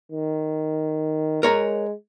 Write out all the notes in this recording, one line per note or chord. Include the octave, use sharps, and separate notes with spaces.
D#3
G#3 A#4 C#5 A#5